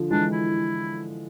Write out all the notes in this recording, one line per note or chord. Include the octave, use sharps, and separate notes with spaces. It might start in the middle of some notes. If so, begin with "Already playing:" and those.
Already playing: D3 F3
E3 G#3 D4
E4